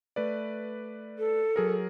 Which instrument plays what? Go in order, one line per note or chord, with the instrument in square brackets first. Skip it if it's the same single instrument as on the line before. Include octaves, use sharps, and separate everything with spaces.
[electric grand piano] A3 B4 D5
[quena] A4
[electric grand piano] F#3 G#4 A#4